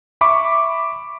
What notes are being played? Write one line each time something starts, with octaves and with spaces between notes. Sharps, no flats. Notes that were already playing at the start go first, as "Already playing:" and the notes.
E5 B5 C#6 D6